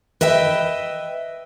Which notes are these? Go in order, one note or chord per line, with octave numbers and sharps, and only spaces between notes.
B4 D#5 E5 G5